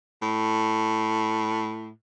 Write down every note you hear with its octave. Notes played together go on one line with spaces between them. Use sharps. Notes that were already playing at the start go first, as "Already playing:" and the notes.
A2